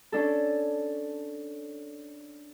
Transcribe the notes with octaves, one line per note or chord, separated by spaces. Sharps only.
C#4 D4 A4